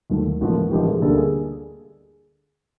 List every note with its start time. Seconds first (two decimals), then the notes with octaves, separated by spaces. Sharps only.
0.10 D#2 D#3 F#3 A3
0.41 A1 G#2 F3 A#3 F#4
0.71 A1 G#2 F3 A#3 G4
0.87 G#4
1.02 D2 D3 G3 A#3 A4
1.17 G#4